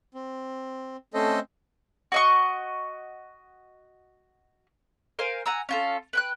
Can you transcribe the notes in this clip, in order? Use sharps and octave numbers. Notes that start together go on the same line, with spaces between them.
C4
A3 C4 C#4 A4 C5 D#5
F#4 D#5 C#6
A#4 C5 F5 G#5
F#5 G#5 A#5 E6
C#4 F4 A4
B4 G5 F#6